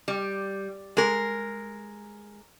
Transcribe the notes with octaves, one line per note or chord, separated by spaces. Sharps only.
G3
G#3 A#4